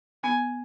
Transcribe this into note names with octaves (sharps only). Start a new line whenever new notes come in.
B3 G#5